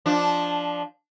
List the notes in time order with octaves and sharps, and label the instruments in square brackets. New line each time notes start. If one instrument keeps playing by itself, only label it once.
[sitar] F3 D4